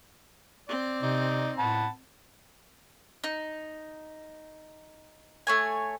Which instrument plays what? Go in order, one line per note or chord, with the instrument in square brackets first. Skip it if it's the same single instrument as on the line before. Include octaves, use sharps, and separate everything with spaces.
[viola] C4 [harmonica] D5
[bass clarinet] C3 [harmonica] D#4 D5
[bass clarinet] A2 [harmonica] F#5 A5 B5
[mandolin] D#4
A3 C#5 G#5